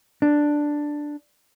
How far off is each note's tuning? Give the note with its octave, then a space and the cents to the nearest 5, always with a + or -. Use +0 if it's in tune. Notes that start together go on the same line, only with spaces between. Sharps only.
D4 +5